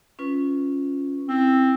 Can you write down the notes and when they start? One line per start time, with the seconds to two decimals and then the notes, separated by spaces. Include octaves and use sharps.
0.19 C#4 F4 B4
1.29 C4 E4